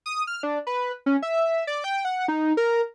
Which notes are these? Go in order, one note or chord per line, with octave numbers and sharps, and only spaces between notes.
D#6
F6
D4
B4
C#4
E5
D5
G5
F#5
D#4
A#4